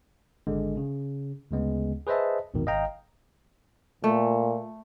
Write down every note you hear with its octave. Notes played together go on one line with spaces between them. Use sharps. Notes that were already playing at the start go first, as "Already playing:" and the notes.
G#1 D3 G#3
C#3
D2 C#3 G#3 B3
G#4 B4 C5 D#5 E5 A5
A#1 E2 G#2 B2 D#3
G#1 D#5 F5 G5 A#5
A#2 A3